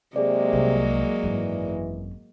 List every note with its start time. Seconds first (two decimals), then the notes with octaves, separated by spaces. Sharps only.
0.16 C3 F#3 G#3 A#3 G#4 D5
0.53 C2
1.23 G#1 F#2 E3